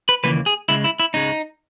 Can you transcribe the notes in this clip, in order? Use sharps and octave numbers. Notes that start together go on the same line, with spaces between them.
B4
D#2 C#3 E3 A#3 B4
G#4
C#2 C#3 G#3 E4
E4
E4
C#2 C#3 G#3 D#4